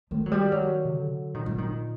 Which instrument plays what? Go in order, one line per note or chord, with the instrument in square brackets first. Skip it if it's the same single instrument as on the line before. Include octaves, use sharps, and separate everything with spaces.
[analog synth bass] D#3 [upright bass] A3
[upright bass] F#3
G3
F#3
[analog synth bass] C3
D3
[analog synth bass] A#2 [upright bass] D#3
[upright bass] F#3
D#3